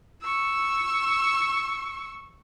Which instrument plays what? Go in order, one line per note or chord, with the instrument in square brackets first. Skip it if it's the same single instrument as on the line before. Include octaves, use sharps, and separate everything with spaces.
[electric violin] C#6 E6